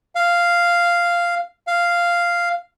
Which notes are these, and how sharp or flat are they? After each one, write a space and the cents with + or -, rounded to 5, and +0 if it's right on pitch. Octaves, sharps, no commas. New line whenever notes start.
F5 -5
F5 -5